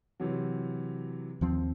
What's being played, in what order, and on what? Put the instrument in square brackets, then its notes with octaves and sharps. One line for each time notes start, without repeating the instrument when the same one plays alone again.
[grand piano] C3 E3 F#3
[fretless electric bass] D#2 F3 C4